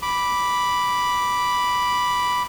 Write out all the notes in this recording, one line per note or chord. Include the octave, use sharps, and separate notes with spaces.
B5 D6